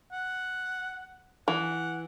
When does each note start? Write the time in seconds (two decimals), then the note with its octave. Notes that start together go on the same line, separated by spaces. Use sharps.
0.12 F#5
1.48 E3 F#5